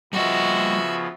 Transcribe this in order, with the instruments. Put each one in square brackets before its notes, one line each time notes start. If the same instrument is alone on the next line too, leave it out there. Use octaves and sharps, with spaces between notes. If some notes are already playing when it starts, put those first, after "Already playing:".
[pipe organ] C#3 F3 B3 [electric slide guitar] G3 D#5 [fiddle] F#4 E5